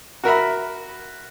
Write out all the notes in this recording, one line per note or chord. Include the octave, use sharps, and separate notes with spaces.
F#4 A#4 E5 B5